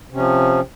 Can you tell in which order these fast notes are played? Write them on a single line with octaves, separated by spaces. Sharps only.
C3 C#4 F3